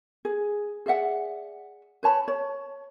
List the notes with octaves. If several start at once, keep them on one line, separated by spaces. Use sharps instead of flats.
G#4
G#4 D5 E5 F#5
B4 C#5 A5 B5
C#5